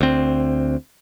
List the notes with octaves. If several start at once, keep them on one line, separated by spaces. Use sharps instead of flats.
D2 C4